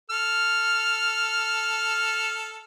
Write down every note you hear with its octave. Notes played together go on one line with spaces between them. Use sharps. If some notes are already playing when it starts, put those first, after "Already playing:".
A4 F6